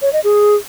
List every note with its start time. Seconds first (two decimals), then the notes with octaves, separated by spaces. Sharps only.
0.02 C#5
0.13 D#5
0.24 G#4